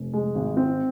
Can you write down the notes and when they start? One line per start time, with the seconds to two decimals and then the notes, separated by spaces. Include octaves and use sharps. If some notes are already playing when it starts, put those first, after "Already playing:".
Already playing: F1
0.13 G#3
0.35 G#1
0.57 C4